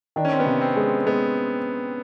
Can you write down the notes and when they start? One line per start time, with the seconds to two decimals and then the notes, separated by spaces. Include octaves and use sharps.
0.16 D#3 D4
0.25 C#4
0.32 C4
0.39 B3 C#4
0.46 C3
0.61 C4
0.76 G#3
1.06 G#3 B3